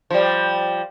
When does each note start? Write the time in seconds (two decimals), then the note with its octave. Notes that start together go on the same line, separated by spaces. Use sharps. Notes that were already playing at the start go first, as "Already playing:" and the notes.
0.10 F3 G3